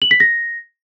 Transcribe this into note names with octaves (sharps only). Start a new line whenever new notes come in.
F#7
B6
A#6